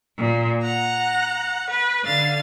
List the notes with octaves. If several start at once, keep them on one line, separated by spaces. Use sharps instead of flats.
A#2
F#5 A#5
B4
D3 F5 A6